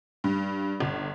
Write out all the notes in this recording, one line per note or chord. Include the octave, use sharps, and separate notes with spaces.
G2
G1